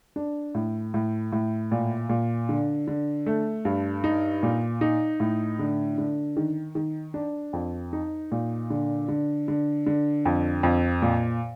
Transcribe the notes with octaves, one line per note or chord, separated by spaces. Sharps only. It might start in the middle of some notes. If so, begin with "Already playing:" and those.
D4
A2
A2
A2
A#2
A#2
D3
D3
A3
G2
D#4
A#2
D#4
A2
D3
D3
D#3
D#3
D4
F2
D#4
A#2
D3
D3
D3
D3
F2
F2
A#2